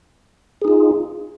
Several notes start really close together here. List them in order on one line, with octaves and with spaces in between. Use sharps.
G#4 D#4 F4